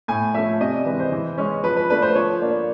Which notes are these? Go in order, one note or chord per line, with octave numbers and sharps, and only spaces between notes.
A2 G#5
F3 A3 C#4 E5
C3 D#5
D5
E3 G#3 B4
C5
E3
G#3 C#4
F3 B4
B4
A3 D4 B4
C5
F3 C#5
A#3 D4